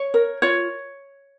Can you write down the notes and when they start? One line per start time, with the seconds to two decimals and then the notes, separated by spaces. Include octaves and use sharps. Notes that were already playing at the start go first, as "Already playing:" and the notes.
Already playing: C#5
0.14 A#4
0.42 F4 C#5